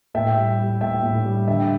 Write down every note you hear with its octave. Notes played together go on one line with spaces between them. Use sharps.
A2 E5 G5
G3
G3
A2 E5 G5
A2
G3
D3 E5 G5